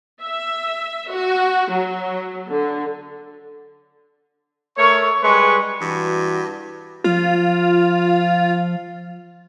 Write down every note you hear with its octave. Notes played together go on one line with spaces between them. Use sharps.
E5
F#4
F#3
D3
A3 A#4 C#5 C#6
G3 G#3 B4 C6 C#6
G2 E3 F#4
F3 F4